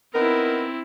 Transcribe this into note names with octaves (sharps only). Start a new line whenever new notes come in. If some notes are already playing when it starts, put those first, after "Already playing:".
B3 C4 D#4 E4 A#4